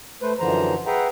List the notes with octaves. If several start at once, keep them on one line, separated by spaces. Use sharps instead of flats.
A3 B4 C5
F#2 D3 E3 F3 C5 A#5
G#4 B4 E5 F#5 G5 A#5